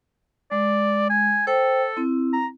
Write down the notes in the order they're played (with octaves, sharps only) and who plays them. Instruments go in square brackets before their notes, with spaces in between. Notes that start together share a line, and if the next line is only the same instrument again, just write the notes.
[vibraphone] G#3 [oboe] D5
[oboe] G#5
[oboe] A4 [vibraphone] C5 G5
[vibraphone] C4 E4
[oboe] A#5